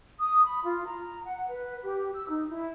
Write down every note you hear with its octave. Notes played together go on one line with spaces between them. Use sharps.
D#6
B5
F4
A#5
F#5
B4
G4
E6
D#4
E4